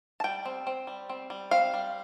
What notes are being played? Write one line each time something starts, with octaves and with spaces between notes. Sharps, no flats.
A5
G3 G5
C4
C4
G3
C4
G3
C4 F5
G3